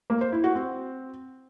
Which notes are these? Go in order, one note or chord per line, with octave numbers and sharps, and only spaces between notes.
A#3
C5
E4
F#4
C4